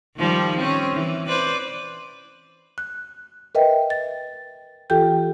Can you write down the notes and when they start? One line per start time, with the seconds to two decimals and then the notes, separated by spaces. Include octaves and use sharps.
0.17 D#3 F3 G3
0.57 C4 C#4
0.93 E3
1.28 B4 C5 D5
2.78 F#6
3.55 A#4 B4 D#5 E5 G5
3.90 A6
4.90 E3 F4 G4 A4 G5 G6